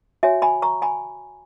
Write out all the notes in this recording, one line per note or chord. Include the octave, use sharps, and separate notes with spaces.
F#4 C#5 E5 G#5
G#5 B5
A#5 C#6
G#5 B5